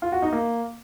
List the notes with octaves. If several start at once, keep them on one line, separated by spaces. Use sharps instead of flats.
F4
F#4
D#4
A#3